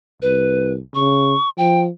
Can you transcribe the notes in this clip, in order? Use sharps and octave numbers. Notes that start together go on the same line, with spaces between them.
C2 B4
C#3 C#6
F3 G5